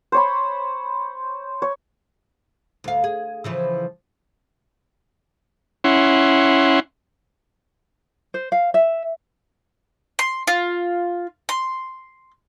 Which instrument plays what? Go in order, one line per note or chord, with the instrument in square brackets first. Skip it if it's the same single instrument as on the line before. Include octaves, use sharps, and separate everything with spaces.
[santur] C5 C#5 B5
C#5
[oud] D2 F5
G#4
C#3 E3 F3
[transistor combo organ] C#4 E4 F#5 C6
[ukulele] C5
F5
E5
[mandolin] C6
F4
C6